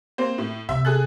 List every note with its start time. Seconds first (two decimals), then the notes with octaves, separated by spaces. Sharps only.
0.18 A#3 C4 C5
0.38 A2
0.69 C3 E5
0.85 G#4 A4 F#6